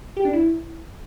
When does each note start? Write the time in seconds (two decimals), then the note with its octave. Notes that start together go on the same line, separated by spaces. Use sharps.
0.17 G4
0.25 D4
0.33 E4